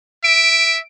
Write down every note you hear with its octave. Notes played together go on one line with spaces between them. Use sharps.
E5 D7